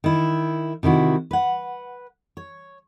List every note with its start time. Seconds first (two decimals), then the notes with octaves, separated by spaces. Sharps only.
0.04 D#3 E4
0.83 C3 D#3 E4 F#4
1.31 B4 F#5
2.37 C#5